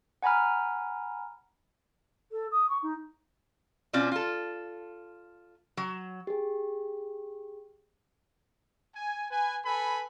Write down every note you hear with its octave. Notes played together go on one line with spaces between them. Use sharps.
F#5 G#5 A#5 B5 F6
A4
D#6
C#6
D#4
B2 C4 C#4 F4 D5
F4 A4
F#3
G4 G#4
G#5
B4 G#5
A4 B4 G#5 B5